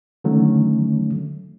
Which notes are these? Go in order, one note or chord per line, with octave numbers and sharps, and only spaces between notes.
D3 D#3 F#3 A3 C#4